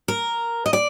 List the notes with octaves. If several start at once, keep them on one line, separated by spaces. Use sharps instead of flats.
A#4
D#5
D5